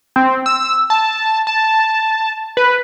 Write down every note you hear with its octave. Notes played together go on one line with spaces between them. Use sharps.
C4
E6
A5
A5
B4